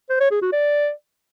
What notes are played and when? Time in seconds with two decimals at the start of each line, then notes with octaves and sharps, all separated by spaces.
0.10 C5
0.20 C#5
0.31 G#4
0.42 F#4
0.52 D5